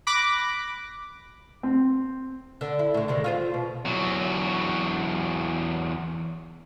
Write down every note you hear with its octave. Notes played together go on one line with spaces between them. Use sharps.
B5 D6 F#6 A#6 B6
C4
D3
E4
A2 D3
C3 D#3 G#3
F4 G#4 C5
B2
E2 F#3